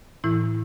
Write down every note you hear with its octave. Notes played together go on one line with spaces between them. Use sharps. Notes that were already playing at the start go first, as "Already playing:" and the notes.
A2 E3 E4